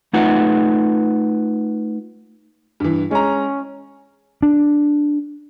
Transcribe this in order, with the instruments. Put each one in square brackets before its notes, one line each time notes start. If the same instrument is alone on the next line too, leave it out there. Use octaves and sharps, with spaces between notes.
[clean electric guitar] A3 D#4 F4 B4 F#5
[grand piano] G2 E3
[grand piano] G#3 A#5 [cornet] C#4
[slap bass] D4